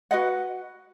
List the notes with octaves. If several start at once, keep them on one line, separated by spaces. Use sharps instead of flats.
F#4 B4 D#5 F#5